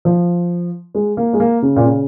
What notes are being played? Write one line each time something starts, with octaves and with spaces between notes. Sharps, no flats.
F3
G#3
A#3
G#3
A#3
C#3
A#2
C#3